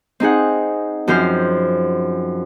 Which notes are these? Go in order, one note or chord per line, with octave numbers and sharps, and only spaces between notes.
C4 D#4 G#4 F#5
F#2 F3 C4 C5 F6